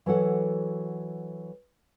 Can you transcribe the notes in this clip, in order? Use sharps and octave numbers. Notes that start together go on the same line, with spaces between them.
E3 F#3 A4 F#5